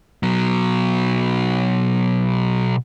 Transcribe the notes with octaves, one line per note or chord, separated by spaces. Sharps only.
B2 F#3